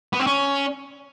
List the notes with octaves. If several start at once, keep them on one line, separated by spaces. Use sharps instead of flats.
B3
C4
C#4